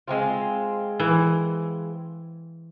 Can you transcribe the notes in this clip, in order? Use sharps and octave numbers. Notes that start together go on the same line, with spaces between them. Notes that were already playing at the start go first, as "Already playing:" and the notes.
G#3 C4 F4
E3